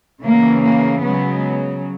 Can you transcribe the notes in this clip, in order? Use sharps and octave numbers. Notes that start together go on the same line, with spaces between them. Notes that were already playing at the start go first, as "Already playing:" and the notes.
C#3 E3 A#3
A#3
C#3 F#3 G#3 B3